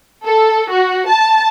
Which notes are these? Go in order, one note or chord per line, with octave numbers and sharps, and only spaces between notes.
A4
F#4
A5